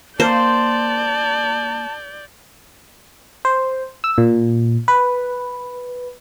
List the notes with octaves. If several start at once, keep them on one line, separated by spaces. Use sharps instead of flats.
A#3 C5 D5 A5 G6
C5
E6
A#2
B4